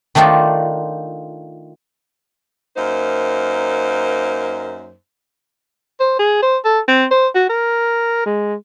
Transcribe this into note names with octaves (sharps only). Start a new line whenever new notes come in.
D#3 A3 D4 D#4 F4
F#2 A#3 D#4 C5
C5
G#4
C5
A4
C4
C5
F#4
A#4
G#3